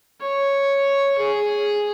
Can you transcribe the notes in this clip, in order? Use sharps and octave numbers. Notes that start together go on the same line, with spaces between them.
C#5
G#4